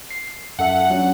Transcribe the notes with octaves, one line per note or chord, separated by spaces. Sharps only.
C7
F#2 A4 E5 F#5
F#3 C#4 D4